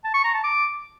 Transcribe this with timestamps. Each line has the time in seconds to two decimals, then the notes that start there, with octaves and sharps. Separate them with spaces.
0.04 A5
0.14 C#6
0.24 A#5
0.34 A5
0.44 D6